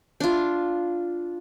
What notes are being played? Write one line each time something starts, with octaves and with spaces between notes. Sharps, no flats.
D4 F4